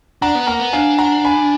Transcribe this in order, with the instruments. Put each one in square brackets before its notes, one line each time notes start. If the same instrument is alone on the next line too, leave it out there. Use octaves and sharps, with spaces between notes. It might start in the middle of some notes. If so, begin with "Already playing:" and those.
[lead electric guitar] D4 [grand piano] F#5 A#5
[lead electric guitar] B3
[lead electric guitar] A#3 [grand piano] F#5 A#5
[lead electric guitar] B3
[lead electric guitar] D4 [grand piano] F5 G#5
[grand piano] F#5 A#5
G#5 B5